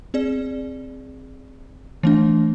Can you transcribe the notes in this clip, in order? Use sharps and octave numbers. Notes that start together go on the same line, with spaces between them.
C4 G#4 D5
E3 A3 D4